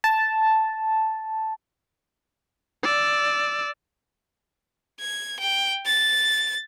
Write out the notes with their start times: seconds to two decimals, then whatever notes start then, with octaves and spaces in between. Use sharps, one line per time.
0.04 A5
2.83 D5 E6
5.00 G#6
5.40 G5
5.86 A6